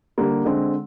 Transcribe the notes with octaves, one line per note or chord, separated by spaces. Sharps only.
D3 G3 A#3
D3 G#3 C4